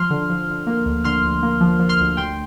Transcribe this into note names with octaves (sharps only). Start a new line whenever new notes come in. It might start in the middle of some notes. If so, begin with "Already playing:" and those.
Already playing: F3 C6 F6
D3
F3
D3
A#3
D2
D3 C6 F6
D2
A#3
F3
F3
C6 F6
D2
D2 G5 C6